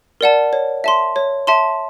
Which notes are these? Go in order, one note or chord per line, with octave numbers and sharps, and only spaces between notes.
A#4 D5 F#5 A5
C#5
E5 A5 C6
C#5
E5 A5 C6